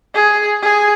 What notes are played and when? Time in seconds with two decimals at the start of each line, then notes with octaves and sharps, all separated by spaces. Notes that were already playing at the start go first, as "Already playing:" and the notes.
0.14 G#4
0.62 G#4